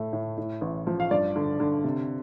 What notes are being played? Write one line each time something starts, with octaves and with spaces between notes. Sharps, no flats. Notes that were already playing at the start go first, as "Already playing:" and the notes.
Already playing: A2 A3
A2
A2
A1
F3
F5
G2 D5
D3
D3
C3